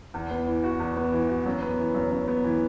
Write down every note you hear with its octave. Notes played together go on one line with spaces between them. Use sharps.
E2
B3
E3
F#4
E2
B3
E3
F#4
F#2
B3
E3
F#2
F#2
B3
E3